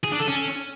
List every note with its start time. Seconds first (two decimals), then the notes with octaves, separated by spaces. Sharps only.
0.04 G#4
0.12 D4
0.20 A4
0.28 C#4